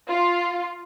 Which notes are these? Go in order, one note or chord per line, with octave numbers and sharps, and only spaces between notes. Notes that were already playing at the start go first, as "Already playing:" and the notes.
F4